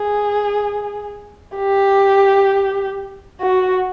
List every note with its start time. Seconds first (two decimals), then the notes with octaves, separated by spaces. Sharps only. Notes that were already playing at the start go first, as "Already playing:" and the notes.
Already playing: G#4
1.57 G4
3.41 F#4